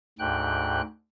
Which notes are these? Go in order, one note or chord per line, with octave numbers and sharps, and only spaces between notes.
D2 G#2 G5 F#6